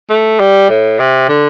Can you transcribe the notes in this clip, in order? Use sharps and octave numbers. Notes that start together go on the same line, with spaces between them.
A3
G3
A2
C3
D3